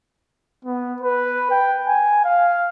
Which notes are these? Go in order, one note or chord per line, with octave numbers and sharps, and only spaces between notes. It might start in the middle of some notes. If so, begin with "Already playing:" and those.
B3
B4
G5
G#5
F5